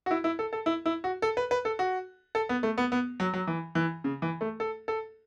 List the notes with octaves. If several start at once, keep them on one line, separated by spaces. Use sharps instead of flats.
F#4
E4
E4
A4
A4
E4
E4
F#4
A4
B4
B4
A4
F#4
A4
B3
A3
B3
B3
F#3
F#3
E3
E3
C#3
E3
A3
A4
A4